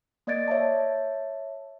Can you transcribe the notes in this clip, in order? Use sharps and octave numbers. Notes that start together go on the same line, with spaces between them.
A#3 D5 D#5 G#6 A6 D7
C#5 E5 A5